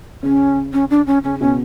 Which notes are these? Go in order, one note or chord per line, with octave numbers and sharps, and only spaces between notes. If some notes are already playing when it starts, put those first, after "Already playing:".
C#3 C#4
C#4
D4
C#4
C#3 C#4
B2 C#4